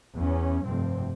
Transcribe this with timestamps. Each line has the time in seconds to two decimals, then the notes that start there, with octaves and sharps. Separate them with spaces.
0.16 E2 C#4
0.66 F1 G2 C4